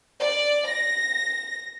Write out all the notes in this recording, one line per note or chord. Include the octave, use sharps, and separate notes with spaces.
D5
A#6